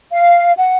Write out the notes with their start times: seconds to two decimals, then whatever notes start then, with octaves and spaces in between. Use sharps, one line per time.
0.11 F5
0.57 F#5